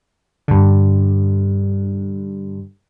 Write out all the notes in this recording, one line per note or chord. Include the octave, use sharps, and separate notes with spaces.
G2 D3